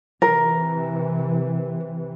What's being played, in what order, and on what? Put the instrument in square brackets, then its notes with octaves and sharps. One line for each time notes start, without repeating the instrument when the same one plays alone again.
[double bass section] C3 E3 [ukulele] A#4